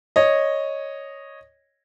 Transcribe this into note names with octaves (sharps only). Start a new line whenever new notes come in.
C#5 D#5